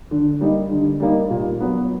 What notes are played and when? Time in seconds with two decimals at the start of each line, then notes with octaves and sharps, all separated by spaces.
0.11 D3
0.41 G3 A#3 D#4
0.71 D3
1.00 G3 A#3 D#4
1.30 A#2
1.60 F#3 B3